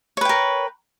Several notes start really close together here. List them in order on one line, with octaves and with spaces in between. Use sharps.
C#5 B4 G5 A#4